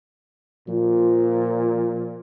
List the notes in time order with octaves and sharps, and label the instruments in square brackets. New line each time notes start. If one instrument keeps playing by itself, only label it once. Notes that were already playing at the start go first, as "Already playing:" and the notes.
[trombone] A#2 [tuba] F3